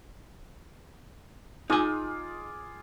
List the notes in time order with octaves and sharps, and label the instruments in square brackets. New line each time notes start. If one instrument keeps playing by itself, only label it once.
[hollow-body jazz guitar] D#4 G#5 [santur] F4 G#4 D6